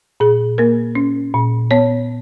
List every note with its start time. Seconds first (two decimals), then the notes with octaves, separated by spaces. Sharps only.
0.20 A#2 G#4
0.58 A#3 A#4
0.95 C#4
1.34 A#2
1.71 B3 C#5